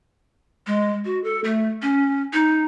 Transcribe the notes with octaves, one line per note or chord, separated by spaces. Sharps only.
G#3
F#4
A4
A3
C#4
D#4